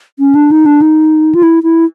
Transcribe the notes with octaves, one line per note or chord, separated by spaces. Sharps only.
C#4
D4
D#4
D4
D#4
F4
E4
E4